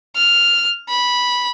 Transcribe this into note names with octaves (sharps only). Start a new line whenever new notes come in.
F6
B5